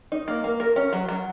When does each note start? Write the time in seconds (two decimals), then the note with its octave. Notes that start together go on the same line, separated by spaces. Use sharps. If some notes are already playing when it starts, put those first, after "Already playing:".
0.12 D#4
0.28 A#3
0.44 A#3
0.60 A#4
0.76 C#4
0.93 F#3
1.09 F#3